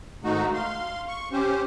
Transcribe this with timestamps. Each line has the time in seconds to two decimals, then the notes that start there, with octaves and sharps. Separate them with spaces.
0.24 G#2 D#3 A3 D#4 F#4
0.54 F5 C6
1.08 C#6
1.32 C#4 G4 C5